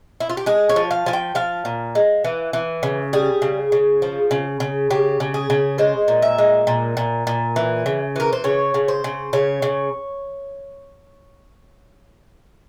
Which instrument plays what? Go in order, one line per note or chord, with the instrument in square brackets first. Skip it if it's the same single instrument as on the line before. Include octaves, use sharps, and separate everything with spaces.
[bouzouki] E4
F4
G4
G#3 G#4
C#5
F3
F5
F3 G#5
G5
F3 F5
A#2
G#3
E3
E3
C#3
G3 G#4
C#3
C#3
F3
C#3
C#3
C#3 G4
C#3
G#4
C#3
G#3 C5
A#2
E5
G#3
A#2
A#2
A#2
E3
C#3
E3 A#4
C5
C#3 C#5
C#3
C5
C#3
C#3 C#5
C#3